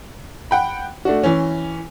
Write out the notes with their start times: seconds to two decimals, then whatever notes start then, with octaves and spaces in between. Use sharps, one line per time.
0.51 F#5 G5 B5
1.05 A3 D4 F#4
1.23 E3 C#4